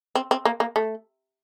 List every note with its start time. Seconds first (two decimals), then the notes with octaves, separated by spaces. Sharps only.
0.15 C4
0.31 C4
0.45 A#3
0.60 A#3
0.76 A3